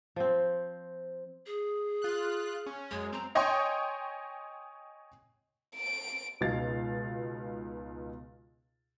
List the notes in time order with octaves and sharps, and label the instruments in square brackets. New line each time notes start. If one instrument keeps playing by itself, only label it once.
[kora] F3 C4
[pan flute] G#4
[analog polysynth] F4 F#6
C#4
[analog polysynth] F#2 G#3 [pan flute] C#5
[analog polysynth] C4 [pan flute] A#5
[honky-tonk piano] C#5 D#5 G5 G#5 C6 C#6
[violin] D7
[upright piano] C#2 B2 D#4 F5 A6